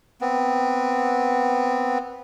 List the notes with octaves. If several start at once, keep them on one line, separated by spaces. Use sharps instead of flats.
B3 C4